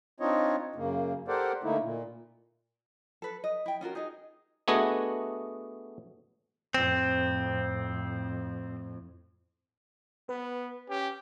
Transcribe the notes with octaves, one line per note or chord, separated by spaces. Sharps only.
C4 D4 D#4 F4 C#5 D#5
F#2 C#3 A#3
G4 A4 A#4 C5 D5 F#5
D3 A3 A#3 D#4 E4
A#2
A4 B4
D#5
E4 G5
C#4 F4 F#4 A#4
D#4 G#4 D#5
A3 B3 D4 F#4 G#4 D#5
F2 A2 C4
B3 B4
C#4 G4